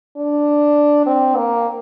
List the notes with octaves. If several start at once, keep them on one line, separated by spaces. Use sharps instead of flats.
D4
C4
A#3